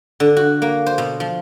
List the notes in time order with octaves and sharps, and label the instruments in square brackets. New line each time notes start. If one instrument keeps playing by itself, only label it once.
[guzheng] D3
F#4
A#3
C5
B2
F3